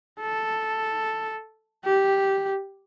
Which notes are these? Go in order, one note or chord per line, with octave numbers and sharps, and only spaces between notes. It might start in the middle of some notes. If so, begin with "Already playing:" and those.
A4
G4